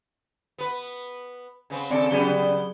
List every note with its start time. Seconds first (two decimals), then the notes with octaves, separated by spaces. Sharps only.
0.58 B3 B4
1.70 C#3 B3 C4
1.91 D#2 C#3 C4 A4 D5 C#7
2.11 C#3 F#3 G3 B3 G#4 G7